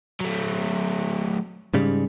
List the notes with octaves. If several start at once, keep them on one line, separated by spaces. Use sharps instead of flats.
F#3 A3
G#2 C#3 G3